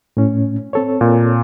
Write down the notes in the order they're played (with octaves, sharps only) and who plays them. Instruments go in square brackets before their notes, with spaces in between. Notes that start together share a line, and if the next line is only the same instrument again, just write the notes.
[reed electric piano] A2 C#4
C4 A4 C#5
[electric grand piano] A#2